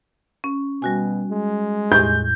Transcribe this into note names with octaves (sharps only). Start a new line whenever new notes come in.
C#4
B2 G3 F#4 G#5
G#3
E2 A2 G6